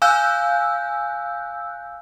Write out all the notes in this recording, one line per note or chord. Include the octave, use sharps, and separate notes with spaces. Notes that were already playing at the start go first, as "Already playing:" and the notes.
F5 G#5 E6 F#6 G6